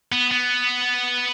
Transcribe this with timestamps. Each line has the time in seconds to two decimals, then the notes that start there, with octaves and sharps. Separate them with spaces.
0.12 B3
0.31 B3